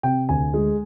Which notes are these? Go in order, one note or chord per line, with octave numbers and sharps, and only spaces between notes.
C3 G5
D2 G#5
G#3